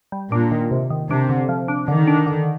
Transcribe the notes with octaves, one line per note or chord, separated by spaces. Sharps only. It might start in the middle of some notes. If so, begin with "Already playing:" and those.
G3
A#2 D4
D#3
C3
D#3
C3 D4
D3
F3
D4
D3 D#3
D4
D3